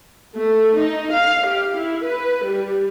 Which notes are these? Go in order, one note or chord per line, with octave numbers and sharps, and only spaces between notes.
A3
D#4
F5
G4
E4
B4
G3